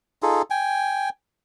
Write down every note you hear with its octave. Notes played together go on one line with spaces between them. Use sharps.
D#4 F4 G#4 A4
G5 G#5